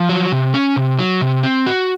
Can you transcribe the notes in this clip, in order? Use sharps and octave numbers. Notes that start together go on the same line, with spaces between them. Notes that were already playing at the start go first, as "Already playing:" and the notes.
Already playing: F3
F#3
C3
C#4
C3
F#3
C3
C4
F#4